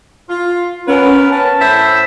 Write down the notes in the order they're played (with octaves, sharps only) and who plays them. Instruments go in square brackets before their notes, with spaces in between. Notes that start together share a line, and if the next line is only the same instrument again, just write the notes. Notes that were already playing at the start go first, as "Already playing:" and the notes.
[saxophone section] F4
[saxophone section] B3 A#4 B4 [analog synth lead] C#4
[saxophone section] B3 C#4 B4 [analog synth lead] A5
[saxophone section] A2 C5 E5